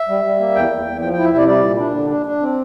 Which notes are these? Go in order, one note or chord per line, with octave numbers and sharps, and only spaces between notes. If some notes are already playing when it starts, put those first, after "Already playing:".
Already playing: E5
G3
G3
A#3
E2 G5
E2
E2
F3 G5
E4 G5
E5
C3 D5
G3 D5
A#2
D4
D3
D4
D4
C4